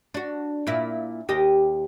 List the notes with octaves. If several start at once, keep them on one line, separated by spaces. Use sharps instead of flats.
D4 F#4
A#2 E4
D#2 G4 D#5